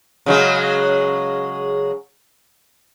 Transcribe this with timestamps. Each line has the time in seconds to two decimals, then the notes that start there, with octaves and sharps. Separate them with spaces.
0.26 C#3 F#3 G#3